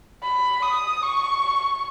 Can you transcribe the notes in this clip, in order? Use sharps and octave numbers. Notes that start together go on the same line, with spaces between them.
B5
D#6
C#6